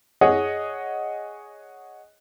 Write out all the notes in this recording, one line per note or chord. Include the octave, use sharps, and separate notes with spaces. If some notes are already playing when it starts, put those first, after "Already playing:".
G#4 C#5 D#5 F#5